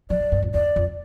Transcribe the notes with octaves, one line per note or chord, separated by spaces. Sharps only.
F3 D5
F3
G2
F2
E2 D5
F2